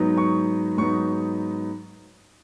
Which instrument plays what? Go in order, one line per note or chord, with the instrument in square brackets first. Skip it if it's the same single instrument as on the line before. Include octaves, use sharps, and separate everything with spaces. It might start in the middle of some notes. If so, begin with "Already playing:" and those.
Already playing: [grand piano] G#2 F#3 B3 D#4
C#6
G#2 F#3 B3 D#4 C#6